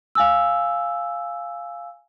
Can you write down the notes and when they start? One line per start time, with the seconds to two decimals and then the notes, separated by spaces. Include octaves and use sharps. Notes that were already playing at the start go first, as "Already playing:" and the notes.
0.15 F5 G#5 E6